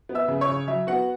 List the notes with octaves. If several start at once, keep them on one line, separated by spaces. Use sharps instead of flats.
B3
E5 E6
C#3
C#5 C#6
C#3
F#3 E5
B3 F#4 F#5